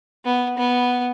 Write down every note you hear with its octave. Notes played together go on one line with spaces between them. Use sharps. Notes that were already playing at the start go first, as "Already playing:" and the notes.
B3
B3